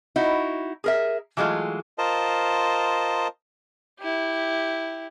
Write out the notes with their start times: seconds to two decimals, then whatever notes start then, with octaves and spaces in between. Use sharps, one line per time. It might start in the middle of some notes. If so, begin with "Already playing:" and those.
0.16 D#4 E4 F#4
0.84 G#4 A#4 E5
1.37 E3 F#3 G#3 A3 F4
1.98 F4 A#4 C5 D#5 A5
4.00 E4 G4